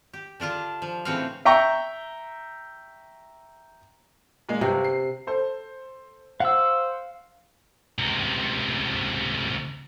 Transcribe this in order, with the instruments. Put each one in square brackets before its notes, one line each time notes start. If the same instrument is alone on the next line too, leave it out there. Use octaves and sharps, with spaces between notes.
[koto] G4
D3 D4 F4 A5
F3
A2 C#3 E3 C4 F#4 F5
[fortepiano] E5 G5 A#5 C#6
[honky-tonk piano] A#2 G#3 A#3
[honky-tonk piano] G1 [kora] C3
[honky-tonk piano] C7
[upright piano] A4 C5
[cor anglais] C5 [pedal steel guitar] F5 E6 [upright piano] F#5
[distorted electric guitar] C#2 C3